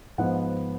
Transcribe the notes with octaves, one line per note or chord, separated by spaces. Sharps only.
G#2 F3 B3 F#5